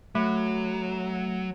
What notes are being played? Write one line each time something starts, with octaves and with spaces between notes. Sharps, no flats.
F#3 A3